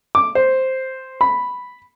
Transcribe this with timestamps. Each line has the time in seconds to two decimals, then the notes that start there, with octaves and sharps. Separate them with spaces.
0.15 D6
0.35 C5
1.21 B5